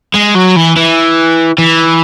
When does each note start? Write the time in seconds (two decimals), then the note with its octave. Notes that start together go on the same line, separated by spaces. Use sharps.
0.14 G#3
0.35 F#3
0.56 E3
0.76 E3
1.58 E3